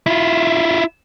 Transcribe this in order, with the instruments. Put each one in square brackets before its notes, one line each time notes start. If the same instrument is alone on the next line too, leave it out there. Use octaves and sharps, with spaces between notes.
[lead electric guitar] E4 F4